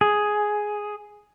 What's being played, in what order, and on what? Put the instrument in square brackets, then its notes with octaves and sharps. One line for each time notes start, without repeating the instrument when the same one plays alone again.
[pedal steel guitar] G#4